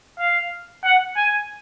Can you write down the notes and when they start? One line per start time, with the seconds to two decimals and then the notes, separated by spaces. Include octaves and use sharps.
0.19 F5
0.83 F#5
1.16 G#5